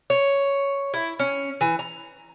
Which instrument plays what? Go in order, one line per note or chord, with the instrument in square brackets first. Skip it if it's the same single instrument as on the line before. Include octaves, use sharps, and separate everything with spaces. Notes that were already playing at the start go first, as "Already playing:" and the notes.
[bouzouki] C#5
E4
C#4
E3
A#5